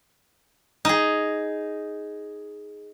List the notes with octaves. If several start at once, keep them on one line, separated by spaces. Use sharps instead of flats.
D#4 G#4